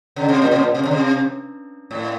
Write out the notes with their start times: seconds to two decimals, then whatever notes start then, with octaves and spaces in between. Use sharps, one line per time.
0.16 C#3
0.28 C3
0.42 A#2
0.51 C3
0.58 A#2
0.75 C3
0.85 C#3
0.91 C3
1.91 A2